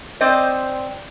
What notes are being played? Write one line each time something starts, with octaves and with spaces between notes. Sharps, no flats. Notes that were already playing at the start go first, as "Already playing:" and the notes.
C4 C5 D5 D#5